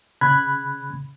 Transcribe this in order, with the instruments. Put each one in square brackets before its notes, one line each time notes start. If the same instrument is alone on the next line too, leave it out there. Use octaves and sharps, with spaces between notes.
[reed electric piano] C#3 B5 F#6 G#6